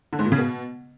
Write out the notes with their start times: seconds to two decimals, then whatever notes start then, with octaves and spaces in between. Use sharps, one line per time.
0.13 D3
0.19 G#2
0.25 A#2
0.32 C#3
0.38 B2